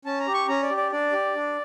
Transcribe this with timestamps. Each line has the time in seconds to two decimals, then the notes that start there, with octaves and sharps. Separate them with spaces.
0.05 C#4 A5
0.20 A#5
0.27 G4
0.34 C#6
0.48 C#4 A#5
0.62 D5
0.70 G4
0.77 D5
0.92 D4 D5
1.13 G4
1.35 D4